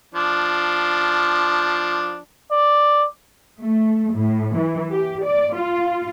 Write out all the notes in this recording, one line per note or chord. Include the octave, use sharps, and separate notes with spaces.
F3 D4
D5
A3
A2
E3
G4
D5
F4